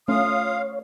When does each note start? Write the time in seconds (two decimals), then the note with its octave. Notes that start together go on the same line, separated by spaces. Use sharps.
0.08 A3 C#4 F4 C#5 F5 C6 D#6